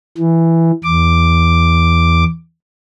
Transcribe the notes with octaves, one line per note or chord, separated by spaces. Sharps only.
E3
E2 D6